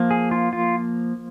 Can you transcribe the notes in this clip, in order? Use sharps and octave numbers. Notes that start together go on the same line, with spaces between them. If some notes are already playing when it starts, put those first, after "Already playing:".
Already playing: F3 A#3
G#4
F4
F4